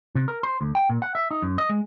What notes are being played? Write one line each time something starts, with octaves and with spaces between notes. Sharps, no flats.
C3
A#4
C5
D2
G5
A#2
F#5
E5
D#4
F#2
D#5
G#3